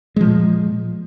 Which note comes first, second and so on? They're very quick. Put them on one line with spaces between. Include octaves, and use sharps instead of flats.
G#3 F3 A#2